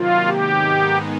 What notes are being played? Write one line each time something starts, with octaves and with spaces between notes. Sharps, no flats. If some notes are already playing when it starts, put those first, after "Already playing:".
Already playing: C3 D#3 F#3 A#3 F4
G#2 D#3 G#3 B3 D#4 G4